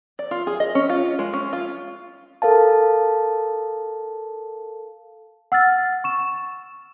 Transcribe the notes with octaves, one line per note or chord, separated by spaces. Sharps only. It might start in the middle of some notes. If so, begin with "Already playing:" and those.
D5
F4
G#4
D#5
C#4
F4
G#3
C#4
F4
A4 A#4 F5 A5
F#5 E6 F6 A6
C#6 E7